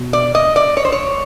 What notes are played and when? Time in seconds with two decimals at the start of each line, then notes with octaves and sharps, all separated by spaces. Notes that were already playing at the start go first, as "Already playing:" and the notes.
Already playing: B2
0.13 D5
0.35 D#5
0.56 D5
0.77 C#5
0.85 C5
0.92 C#5